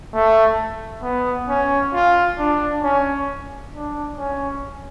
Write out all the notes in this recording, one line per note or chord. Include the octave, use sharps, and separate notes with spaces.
A3
B3
C#4
F4
D4
C#4
D4
C#4